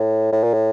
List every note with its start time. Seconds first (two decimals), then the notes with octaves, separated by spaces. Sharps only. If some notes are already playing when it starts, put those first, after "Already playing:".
Already playing: A2
0.32 A2
0.44 A#2
0.54 A2